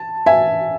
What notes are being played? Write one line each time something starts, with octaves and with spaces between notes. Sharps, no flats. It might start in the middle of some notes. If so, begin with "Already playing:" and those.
Already playing: A5
E5 G#5